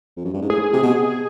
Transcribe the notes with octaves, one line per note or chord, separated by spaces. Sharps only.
F2
F#2
G2
G#2
A2 G#4
C3
B2